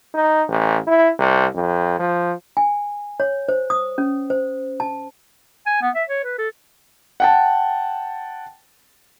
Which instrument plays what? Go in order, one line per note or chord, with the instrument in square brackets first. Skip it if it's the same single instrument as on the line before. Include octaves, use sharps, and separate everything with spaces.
[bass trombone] D#4
A1
E4
C2
F2
F3
[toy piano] G#5
C#5
C5
D#6
C#4
C5
A5
[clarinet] G#5
B3
E5
C#5
B4
A4
[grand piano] F#5 G5 A5